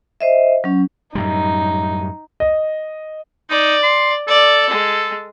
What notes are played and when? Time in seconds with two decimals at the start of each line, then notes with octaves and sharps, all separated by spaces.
0.21 C5 D#5 E5
0.64 F#3 C#4
1.15 F#2 A2 G3 D#4
2.40 D#5
3.50 D#4 D5
3.83 C6
4.28 A4 D5
4.70 G#3